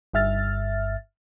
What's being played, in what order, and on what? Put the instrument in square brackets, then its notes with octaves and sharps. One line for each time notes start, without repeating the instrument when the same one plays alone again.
[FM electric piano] G1 G2 E5 F6 A6